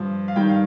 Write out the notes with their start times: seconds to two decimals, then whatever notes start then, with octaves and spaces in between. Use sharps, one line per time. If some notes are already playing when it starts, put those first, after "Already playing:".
Already playing: G2 F3
0.28 F5
0.36 G2 D#3 G3 G5
0.49 F5